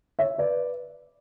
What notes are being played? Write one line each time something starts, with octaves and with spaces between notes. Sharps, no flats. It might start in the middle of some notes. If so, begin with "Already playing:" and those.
C#5 E5
B4 D5